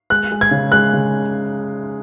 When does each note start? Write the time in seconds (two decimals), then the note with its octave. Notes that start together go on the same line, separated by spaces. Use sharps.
0.10 G#3 F#6
0.32 G#3
0.41 G#6
0.51 C#3
0.72 G#3 F#6
0.93 C#3